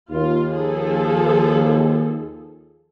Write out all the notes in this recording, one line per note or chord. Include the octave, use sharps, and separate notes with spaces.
D#2 F4
F3 G#4 A4